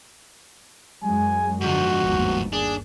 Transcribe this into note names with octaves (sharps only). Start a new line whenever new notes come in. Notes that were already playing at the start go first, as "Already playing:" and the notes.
F#2 F#3 G#3 G#5
G#2 D3 F3 F#4
G1 D#2
D4 G#4